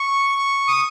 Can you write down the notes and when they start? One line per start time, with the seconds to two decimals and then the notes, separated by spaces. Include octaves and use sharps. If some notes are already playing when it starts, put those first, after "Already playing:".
Already playing: C#6
0.68 D#6